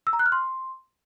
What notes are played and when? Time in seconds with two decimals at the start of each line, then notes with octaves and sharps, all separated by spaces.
0.07 E6
0.13 A#5
0.19 F#6
0.26 F6
0.32 C6